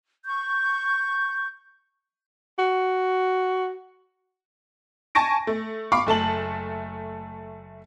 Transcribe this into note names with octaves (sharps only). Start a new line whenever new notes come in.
C#6 G6
F#4
G#5 A5 C#6 A#6 D7
A3
F5 B5 C#6 D6
F#1 A3 A5 F#7